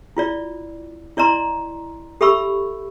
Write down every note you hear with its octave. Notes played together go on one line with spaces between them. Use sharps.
E4 F4 D5
E4 D5 D#5 A#5 C6
G4 A4 E5 B5 C#6 E6